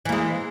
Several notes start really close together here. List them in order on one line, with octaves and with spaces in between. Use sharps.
E3 A#3 G#3